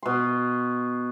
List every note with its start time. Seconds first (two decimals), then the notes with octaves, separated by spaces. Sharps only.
0.03 B2 C6